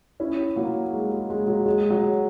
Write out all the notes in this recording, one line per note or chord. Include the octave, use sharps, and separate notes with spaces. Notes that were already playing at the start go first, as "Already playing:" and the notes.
C#4 E4
F#3 A#3
G#3
G#3
G#3
F#3
G#3
F#3